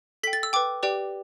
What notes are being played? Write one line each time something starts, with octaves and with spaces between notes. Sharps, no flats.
A4 G5 B6
A6
E6
B4 G5 D6
G4 B4 D5 G5